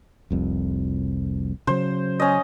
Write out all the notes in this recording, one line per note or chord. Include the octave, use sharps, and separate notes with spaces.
F1 C2 F2
C#3 F#3 C5
C#4 D#5